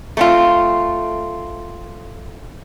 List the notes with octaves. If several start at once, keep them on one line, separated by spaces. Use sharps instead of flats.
A3 C4 F4